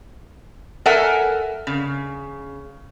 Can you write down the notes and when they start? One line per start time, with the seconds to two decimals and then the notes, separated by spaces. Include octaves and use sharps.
0.86 A4 A#4 E5 F#5 G#5
1.67 C#3